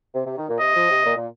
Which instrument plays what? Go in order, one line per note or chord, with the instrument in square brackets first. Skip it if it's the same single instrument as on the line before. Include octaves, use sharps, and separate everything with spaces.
[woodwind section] C3
C3
D#3
A#2
[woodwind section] C3 [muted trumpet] D#5
[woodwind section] F3
C3
A#2
A#2